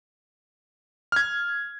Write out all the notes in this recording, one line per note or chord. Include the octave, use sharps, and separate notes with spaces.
F6 G#6